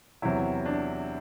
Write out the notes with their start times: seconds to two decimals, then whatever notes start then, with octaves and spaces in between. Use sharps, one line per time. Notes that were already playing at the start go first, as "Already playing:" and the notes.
0.22 E2 C3 F#3 E4
0.65 D4